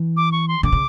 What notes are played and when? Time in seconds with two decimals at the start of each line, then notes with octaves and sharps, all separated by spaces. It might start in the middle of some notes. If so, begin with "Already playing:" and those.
Already playing: E3
0.17 D6
0.32 C#6
0.48 C6
0.63 D3 D6
0.72 C#3